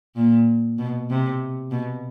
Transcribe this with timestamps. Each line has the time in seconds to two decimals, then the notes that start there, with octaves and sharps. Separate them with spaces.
0.16 A#2
0.78 B2
1.10 C3
1.71 B2